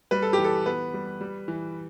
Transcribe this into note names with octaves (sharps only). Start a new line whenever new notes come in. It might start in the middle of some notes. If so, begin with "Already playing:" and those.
G3 B4
A4
G4
E3
A4
B3 B4
G3
G3
E3